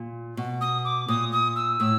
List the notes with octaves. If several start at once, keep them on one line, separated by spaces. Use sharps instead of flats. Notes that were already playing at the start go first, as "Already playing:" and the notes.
Already playing: A#2
B2
D#6
D6
A#2 D#6
D#6
E6
A2 E6